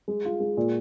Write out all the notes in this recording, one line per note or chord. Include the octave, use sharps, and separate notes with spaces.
G#3
F4
G#3
A#2